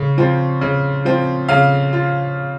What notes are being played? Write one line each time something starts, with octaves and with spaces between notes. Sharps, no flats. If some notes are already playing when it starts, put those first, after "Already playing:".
Already playing: C#3
F3 C4 F4
C#3
F3 C4 F4
C#3 F5
F4